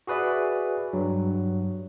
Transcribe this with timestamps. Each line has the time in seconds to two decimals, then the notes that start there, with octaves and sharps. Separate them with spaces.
0.07 F#4 G#4 B4 D5 E5
0.93 G2 F#3